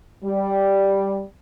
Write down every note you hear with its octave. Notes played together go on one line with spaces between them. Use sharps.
G3